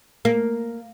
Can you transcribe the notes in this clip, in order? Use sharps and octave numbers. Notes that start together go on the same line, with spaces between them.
A#3